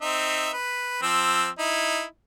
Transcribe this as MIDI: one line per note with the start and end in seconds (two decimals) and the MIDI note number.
0.01 0.51 60
0.01 0.51 63
0.01 0.51 76
0.53 1.01 71
1.02 1.48 53
1.02 1.48 60
1.02 1.48 88
1.59 2.03 63
1.59 2.03 64